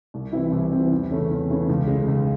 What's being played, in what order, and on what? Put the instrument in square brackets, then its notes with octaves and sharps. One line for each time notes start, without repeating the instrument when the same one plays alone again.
[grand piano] C2
C3 E3 C4 E4
C2
C3 E3 C4 E4
E2
C#3 E3 A3 C#4
E2
C#3 E3 A3 C#4
C#2
C#3 G#3 D#4
C#2